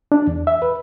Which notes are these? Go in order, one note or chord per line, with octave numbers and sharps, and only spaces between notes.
D4
E2
E5
B4